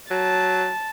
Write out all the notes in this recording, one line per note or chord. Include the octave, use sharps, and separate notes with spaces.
F#3 A5